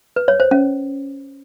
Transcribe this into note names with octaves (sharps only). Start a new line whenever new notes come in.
B4
C#5
C5
C#4